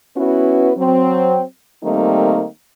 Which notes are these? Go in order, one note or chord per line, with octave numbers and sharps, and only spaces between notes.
B3 C#4 E4 F#4 B4
F#3 C4
D#3 G3 A3 A#3 C4 D#4